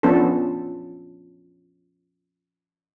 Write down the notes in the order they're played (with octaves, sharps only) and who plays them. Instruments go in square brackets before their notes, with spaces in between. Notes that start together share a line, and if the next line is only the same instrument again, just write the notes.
[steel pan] F3 B3 C#4 D4 A4